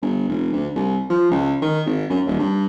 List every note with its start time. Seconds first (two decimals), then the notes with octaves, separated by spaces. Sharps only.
0.02 G1
0.29 F1
0.52 D2
0.75 C2
1.10 F3
1.31 C#2
1.62 D#3
1.86 G#1
2.10 F#2
2.26 D#1
2.39 G2